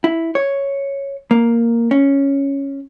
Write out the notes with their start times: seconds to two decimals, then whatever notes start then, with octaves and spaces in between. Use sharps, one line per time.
0.04 E4
0.35 C#5
1.31 A#3
1.91 C#4